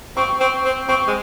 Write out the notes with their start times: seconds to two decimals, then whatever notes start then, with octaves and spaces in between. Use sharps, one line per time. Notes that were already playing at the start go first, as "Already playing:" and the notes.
0.17 C4 C#6
0.40 C4
0.65 C4
0.88 C4 C#6
1.07 G#3